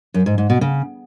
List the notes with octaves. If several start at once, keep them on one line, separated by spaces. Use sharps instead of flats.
F#2
G#2
G#2
B2
C#3